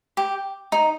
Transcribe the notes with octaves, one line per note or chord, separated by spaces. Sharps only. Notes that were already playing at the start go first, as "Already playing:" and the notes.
G4
D#4